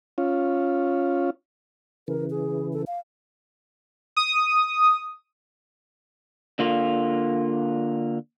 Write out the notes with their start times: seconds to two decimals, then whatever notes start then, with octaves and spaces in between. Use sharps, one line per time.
0.18 C#4 F4
2.08 C#3 E3 A#4
2.30 G#4
2.73 A4
2.87 F5
4.17 D#6
6.59 D3 A#3 F4